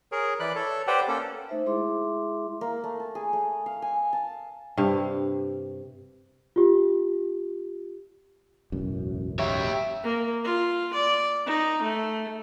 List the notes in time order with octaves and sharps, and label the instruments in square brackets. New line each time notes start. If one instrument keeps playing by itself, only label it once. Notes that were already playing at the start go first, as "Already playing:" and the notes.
[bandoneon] G#4 A#4 C#5
E3 D5 B5 F#6
A4 C#5
G4 B4 C5 D5 F#5 G5
A#3 C#4 A4
[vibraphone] A3 D#4 C5 E5
G#3 E4 G#4 E5 C6 D6
[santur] A#3
A3
A5
G#4
A3
F5
G#5
A5
[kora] G2 C3 F5
[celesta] F4 G4
[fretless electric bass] E1 A1 F#2
[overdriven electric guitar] G4 C#5 [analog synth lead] E5
[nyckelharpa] A#3
F4
D5
D#4
A3